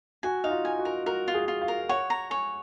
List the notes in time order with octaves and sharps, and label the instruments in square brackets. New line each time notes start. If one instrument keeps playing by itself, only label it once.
[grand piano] F#4 [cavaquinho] G#5
[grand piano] D#4 [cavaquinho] F5
[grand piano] F4
[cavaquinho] G#5
[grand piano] F#4
[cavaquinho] A#4
[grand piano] F#4 [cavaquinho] A#4
[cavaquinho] F4
[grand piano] G#4
[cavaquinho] F4
[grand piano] F5
[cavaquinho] A#4
[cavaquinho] C#5 [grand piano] F#5
[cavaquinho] A#5
[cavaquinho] C#5 [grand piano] G#5